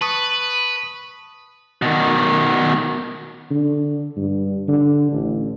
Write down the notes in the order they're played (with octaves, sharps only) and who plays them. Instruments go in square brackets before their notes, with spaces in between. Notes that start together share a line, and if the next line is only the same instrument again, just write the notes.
[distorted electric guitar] B4 [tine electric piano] A5 C#6 D#6
[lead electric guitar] B2 D#3
[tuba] D3
G2
D3
A1